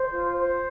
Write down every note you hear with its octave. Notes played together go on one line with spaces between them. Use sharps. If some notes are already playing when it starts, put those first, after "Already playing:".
Already playing: C5
F4
C5